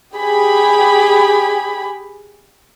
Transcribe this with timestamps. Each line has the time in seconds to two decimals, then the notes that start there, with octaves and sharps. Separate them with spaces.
0.13 G4 G#4 B5